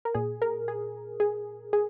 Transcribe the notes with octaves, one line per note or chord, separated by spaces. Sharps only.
A#4
A#2 G#4
A#4
G#4
G#4
G#4